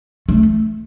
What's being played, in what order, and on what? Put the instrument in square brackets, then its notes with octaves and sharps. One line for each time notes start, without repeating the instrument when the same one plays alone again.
[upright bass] A3